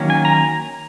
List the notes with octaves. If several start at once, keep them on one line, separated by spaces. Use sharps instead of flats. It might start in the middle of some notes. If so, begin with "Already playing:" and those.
Already playing: D#3 F#3 A#3 C#4
G#5
A#5